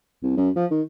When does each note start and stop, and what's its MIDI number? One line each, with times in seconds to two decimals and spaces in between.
0.23 0.34 36
0.37 0.49 42
0.56 0.66 53
0.71 0.82 51